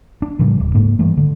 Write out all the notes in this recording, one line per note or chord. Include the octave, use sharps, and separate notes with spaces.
D4
A2 C#3 F3 G3
D1
G#2 A#3
G2 E3 A3
D3